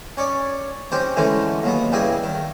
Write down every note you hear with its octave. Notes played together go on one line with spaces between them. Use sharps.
C#4 C#5 D5
C4 C#4 D#4 G4 C5
D3 E3 G#3 A3 C#4
D#2 F#3 B3
G2 C#3 G3 E4 G#4 E5
D#3